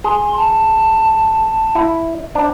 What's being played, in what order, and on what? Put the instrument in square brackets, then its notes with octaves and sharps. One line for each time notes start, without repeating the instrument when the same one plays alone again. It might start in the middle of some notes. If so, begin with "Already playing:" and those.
[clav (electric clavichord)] G#4 [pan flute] C6
[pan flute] A5
[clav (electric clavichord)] E4
[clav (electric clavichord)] D4 [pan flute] C5